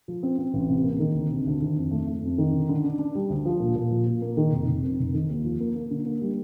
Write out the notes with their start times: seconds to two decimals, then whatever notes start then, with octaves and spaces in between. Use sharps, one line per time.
0.08 F3
0.23 C4
0.38 C4
0.53 A1
0.69 C3
0.84 A#3
0.99 D#3
1.14 D2
1.30 C3
1.46 D2
1.61 D#3
1.76 F2
1.91 A3
2.07 A3
2.23 F2
2.38 D#3
2.52 D3
2.69 D3
2.84 D4
2.99 D4
3.15 G3
3.30 D2
3.45 F3
3.60 A#2
3.76 A#2
3.91 F3
4.06 A#2
4.22 A#3
4.37 D#3
4.52 F1
4.68 F1
4.84 F2
4.99 F1
5.14 D#3
5.29 D#2
5.45 F3
5.60 A#3
5.75 A#3
5.91 D3
6.06 A#3
6.21 G3